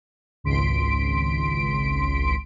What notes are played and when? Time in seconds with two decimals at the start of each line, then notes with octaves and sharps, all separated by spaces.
0.44 G#1 C#2 C6 B6 D7